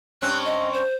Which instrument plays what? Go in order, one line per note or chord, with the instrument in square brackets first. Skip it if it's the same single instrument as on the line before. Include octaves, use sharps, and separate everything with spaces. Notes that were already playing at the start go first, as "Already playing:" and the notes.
[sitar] G2 C4 C#4 [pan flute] F#6
[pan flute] D#5
C5